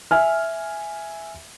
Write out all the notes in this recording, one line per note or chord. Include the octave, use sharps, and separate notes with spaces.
E5 G#5 F6